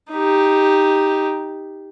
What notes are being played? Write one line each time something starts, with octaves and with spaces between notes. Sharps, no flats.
D#4 G4